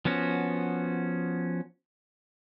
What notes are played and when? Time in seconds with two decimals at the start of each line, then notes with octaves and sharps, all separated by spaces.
0.05 F3 B3 C#4 F#4